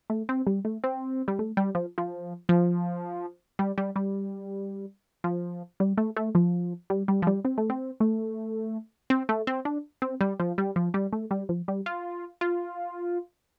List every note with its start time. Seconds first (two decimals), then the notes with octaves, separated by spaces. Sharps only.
0.10 A3
0.29 C4
0.47 G3
0.65 A3
0.84 C4
1.28 G3
1.39 A3
1.57 G3
1.75 F3
1.98 F3
2.49 F3
3.59 G3
3.78 G3
3.96 G3
5.24 F3
5.80 G3
5.97 A3
6.16 A3
6.35 F3
6.90 G3
7.08 G3
7.22 F3
7.27 G3
7.45 C4
7.58 A3
7.70 C4
8.00 A3
9.10 C4
9.29 A3
9.47 C4
9.65 D4
10.02 C4
10.21 G3
10.40 F3
10.58 G3
10.76 F3
10.94 G3
11.13 A3
11.31 G3
11.49 F3
11.68 G3
11.86 F4
12.41 F4